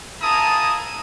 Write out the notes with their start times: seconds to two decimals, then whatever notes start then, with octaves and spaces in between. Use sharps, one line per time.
0.22 A#3 E4 G#4 A5 A#5 D#6